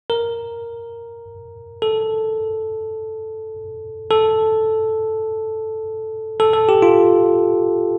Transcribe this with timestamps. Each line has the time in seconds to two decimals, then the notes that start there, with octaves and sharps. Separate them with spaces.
0.10 A#4
1.82 A4
4.11 A4
6.40 A4
6.53 A4
6.69 G4
6.82 F4